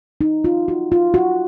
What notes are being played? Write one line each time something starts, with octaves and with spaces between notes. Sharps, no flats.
D#4
F4
F#4
F4
F#4